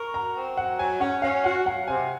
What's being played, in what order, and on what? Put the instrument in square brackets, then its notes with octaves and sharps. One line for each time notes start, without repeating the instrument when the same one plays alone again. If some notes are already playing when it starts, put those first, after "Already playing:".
Already playing: [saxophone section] A#4 [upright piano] A#5 C#6
[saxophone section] F#4 [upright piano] A#5
[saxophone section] C4
[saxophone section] F#3 [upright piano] F#5
[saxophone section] F#3 [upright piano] G#5
[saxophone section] C#4 [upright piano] F#5
[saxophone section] C#4 [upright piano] F5
[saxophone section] F#4 [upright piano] F#5
[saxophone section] F#3 [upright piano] F#5
[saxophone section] C3 [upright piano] G#5